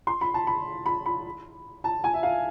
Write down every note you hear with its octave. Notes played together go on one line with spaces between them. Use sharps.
C6
B5
A5
B5
B5
B5
A5
G#5
E5
F5